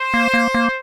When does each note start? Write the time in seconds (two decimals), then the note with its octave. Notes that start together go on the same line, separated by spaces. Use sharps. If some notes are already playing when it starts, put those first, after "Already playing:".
Already playing: C5
0.14 A#3
0.34 A#3
0.54 A#3